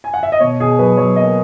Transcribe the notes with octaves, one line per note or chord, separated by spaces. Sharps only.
G#5
F#5
E5
D#5
B2 C#5
B2 G#4
F#3 B4
F#3 C#5
A#3 D#5